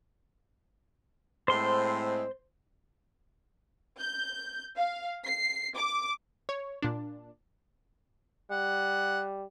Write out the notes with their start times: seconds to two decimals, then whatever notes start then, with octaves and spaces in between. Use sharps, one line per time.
1.48 A2 G#3 C4 C5 C6
3.99 G6
4.77 F5
5.25 C7
5.75 D6
6.49 C#5
6.82 A#2 D4
8.51 G3 F#5